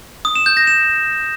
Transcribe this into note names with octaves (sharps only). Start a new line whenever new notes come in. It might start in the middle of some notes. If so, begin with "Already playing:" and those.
D#6
E7
G6
A#6
E7